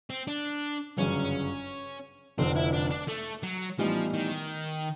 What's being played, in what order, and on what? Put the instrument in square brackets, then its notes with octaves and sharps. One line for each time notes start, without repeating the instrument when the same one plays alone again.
[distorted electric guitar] C4
D4
[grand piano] G1 F#2 C#3 F#3 [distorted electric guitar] C#4
[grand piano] F1 F2 D3 F3 [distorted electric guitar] C4
[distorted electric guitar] E4
D4
D4
A3
F#3
[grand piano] A2 E3 G3 B3 D#4 [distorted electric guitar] F3
[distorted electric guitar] D#3